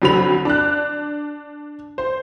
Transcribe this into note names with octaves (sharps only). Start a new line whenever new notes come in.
F2 D3 F#3 C4 B5 F7
D4 F#6
C5